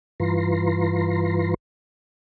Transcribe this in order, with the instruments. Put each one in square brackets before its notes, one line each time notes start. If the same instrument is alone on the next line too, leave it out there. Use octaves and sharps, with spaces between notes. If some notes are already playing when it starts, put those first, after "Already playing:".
[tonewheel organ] G2 E3 F4 B4 A#5 C6